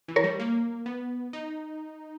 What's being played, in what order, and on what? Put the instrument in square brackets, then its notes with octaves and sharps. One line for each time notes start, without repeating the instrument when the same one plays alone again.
[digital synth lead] E3
[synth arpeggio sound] A#4 C#5
[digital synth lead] G3
A#3
B3
D#4